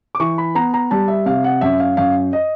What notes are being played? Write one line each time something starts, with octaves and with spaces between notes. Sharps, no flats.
D6
E3 C#6
B5
B3 A#5
A#5
G3 A5
E5
C3 F5
F#5
F#2 E5
F5
F#2 F5
D#5